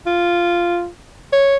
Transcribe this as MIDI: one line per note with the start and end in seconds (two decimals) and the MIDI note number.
0.06 0.88 65
1.33 1.57 73